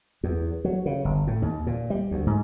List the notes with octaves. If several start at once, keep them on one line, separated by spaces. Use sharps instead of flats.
E2
F#3
C#3
G1
A2
D#2
A#2
G3
D2
G#2